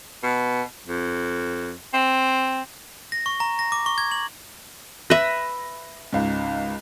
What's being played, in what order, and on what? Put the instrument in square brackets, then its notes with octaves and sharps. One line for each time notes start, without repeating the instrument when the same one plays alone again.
[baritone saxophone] B2
F2
C4
[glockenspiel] A#6
C#6
A#5
A#6
D6
C#6
G#6
F#7
[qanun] B4 E5 [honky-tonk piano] A#6
[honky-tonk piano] C#2 G#2